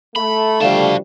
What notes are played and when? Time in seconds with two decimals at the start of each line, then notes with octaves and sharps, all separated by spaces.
0.16 A3 B5
0.61 D3 F3 G3 F#4 F5 A5